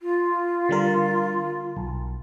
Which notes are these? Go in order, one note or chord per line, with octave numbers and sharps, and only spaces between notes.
F4
D3 G3 A#4
B1